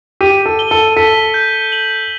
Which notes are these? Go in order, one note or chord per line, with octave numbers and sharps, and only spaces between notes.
G4 D#7
A4
G7
A4
A4 B6
G6
F#7